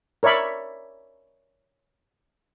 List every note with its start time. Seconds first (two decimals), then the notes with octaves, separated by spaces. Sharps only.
0.23 A#4 C#5 D5 E5 B5